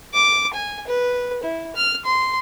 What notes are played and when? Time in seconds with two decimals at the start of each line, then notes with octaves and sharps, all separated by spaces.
0.14 D6
0.54 G#5
0.88 B4
1.43 E4
1.76 F6
2.06 C6